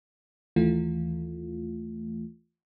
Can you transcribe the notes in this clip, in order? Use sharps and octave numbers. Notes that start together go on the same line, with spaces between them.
D#2 E3 A3 F4